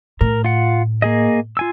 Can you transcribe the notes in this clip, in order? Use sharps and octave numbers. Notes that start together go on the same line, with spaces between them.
A2 A#4
F4 F#5
A#3 G#4 D#5
F4 G#5 E6